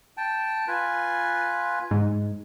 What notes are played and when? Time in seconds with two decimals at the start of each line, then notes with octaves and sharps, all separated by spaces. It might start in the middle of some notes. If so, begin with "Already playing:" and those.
0.17 G5 A5
0.68 F4 B4 G#5
1.91 G#2